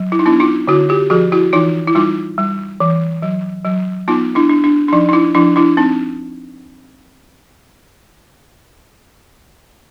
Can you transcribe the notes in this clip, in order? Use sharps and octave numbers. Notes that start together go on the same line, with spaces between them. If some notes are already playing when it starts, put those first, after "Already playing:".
Already playing: F#3
E4
D#4
B3 D4 E4
D#4 F4
D3 E4 F#4
F4 G4
F3 F#4 G#4
E4 F#4
E3 D#4 F4
E4
G3 D#4 F4
G3
E3
F#3
F#3
B3 D#4 F4
D4 E4
D4
D4
D4
F3 D#4
D#4
D4 E4
F3 D4 E4
D4 E4
C4 D#4